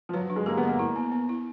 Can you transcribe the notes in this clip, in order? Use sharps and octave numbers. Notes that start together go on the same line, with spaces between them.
F3
F#3 B4
D4
G#3
A#3 G4
B3
B4
A#3
E4
B3
B3
E4